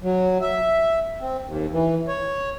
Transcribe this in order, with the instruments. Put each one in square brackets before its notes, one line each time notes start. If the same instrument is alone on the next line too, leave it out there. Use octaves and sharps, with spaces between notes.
[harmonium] F#3
E5
C4
D#2
E3
C#5